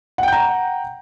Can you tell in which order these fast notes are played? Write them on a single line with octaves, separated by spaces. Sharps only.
F#5 G5 G6 A#5